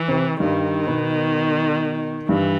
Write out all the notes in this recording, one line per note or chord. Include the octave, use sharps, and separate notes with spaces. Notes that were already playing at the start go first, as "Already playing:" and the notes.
Already playing: E3
C3 C4
G2 D#3 G3
B2 B3
G2 E3 G3